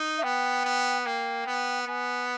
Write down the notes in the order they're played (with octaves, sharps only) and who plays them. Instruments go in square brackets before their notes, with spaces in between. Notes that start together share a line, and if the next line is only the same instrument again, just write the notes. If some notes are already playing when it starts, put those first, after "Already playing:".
Already playing: [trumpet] D#4
[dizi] E5
[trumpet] B3 [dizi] G5
[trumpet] B3
[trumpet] A#3 [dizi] G5
[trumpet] B3
[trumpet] B3 [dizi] G#5